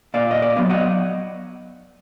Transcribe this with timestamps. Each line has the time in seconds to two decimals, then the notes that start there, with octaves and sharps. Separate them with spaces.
0.14 A#2 D5 F5
0.31 D#5
0.42 D5 F5
0.56 F#3 B3
0.70 D#5 F#5